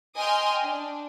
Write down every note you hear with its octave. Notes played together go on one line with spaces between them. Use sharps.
D#5 G5 G#5 C6 D#6 F6
D4